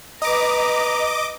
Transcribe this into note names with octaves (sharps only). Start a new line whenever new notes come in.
B4 D#5 A#5 D6